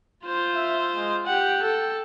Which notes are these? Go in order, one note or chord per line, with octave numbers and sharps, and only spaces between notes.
F4 C5
E5
G#3
G4 F#5 G5
A4